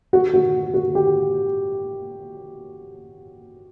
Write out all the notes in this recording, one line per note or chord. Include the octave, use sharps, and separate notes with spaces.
F#4
F#4
F#4
G4